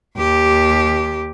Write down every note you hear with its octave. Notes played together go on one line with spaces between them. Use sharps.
D#2 G4